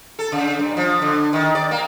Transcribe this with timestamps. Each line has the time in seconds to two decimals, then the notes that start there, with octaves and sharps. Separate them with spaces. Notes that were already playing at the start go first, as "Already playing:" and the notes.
0.19 A4
0.32 C#3
0.59 G2
0.77 F3
1.02 D3
1.33 D#3
1.55 D5
1.71 A#3